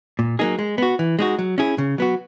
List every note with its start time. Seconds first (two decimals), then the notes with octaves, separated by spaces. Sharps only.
0.19 A#2
0.39 F#3 A#3 D#4 G#4
0.59 G#3
0.78 B3 F#4
0.99 E3
1.19 G#3 D#4 F#4
1.39 F#3
1.58 C#4 E4 G#4
1.78 C#3
1.98 F#3 B3 F#4